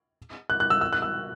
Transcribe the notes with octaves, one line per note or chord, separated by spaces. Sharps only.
F#6
F#6
E6
E6
F#6
E6